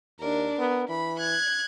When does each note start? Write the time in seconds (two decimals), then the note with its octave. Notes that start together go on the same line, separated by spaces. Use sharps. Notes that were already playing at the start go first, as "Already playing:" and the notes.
0.20 D#2 D4 A#4
0.59 B3 A#4
0.89 E3 B5
1.19 F#6 G#6